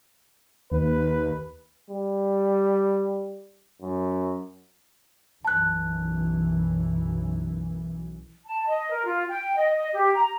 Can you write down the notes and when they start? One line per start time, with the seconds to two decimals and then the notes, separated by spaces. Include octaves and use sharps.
0.71 D#2 B4
1.91 G3
3.82 F#2
5.45 B1 F#2 E3 A5 F#6
8.45 A5
8.66 D#5
8.90 A#4
9.04 F4
9.28 G5
9.55 D#5
9.74 D#5
9.93 G4
10.14 A#5